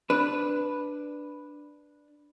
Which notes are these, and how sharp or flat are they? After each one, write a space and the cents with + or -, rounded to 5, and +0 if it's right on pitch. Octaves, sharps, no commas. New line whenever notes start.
D4 +5 B4 +0